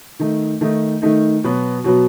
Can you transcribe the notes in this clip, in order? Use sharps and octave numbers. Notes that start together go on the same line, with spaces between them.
D#3 A3 D#4
D#3 A3 D#4
D#3 A3 D#4
B2 F#3 B3
B2 F#3 B3